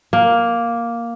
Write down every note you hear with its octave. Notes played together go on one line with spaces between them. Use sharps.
A#3